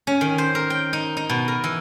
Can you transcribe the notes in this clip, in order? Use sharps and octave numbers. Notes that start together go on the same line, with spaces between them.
C#4
D#3
C5
A#4
G5
D#4
D#4
B2
A#4
E3